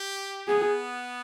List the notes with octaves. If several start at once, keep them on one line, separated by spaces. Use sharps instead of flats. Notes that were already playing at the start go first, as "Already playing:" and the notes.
Already playing: G4
B3 G#4